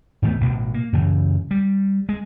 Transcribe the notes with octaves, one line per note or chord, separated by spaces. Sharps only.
G#2 D#3 A3 B3
A1 B2
A#3
F#2 C#3 E3
G3
G#3